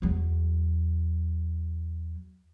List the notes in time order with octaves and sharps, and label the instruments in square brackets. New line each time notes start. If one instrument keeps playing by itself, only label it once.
[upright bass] E2 F#3